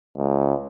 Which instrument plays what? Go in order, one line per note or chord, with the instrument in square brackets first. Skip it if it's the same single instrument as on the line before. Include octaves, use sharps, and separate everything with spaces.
[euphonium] C#2